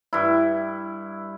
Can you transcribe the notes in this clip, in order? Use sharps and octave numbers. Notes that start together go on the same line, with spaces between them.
G2 E4